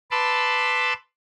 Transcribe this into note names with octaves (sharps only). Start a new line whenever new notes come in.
B4 A5 B5 C6 D6 E6